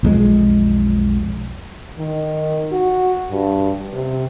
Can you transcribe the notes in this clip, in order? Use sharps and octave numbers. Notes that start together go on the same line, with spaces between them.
B1 F2 G#3
D#3
F#4
G2
C3